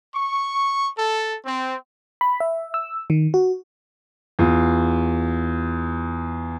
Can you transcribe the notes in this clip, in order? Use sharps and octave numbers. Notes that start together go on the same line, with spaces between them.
C#6
A4
C4
B5
E5
E6
D#3
F#4
E2 F4